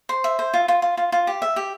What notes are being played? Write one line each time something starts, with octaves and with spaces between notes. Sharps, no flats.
C5
E5
C5
F4
F4
F4
F4
F4
G4
E5
G4